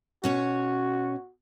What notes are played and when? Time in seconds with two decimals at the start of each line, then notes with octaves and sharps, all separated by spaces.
0.24 B2 C#4 F#4 C#5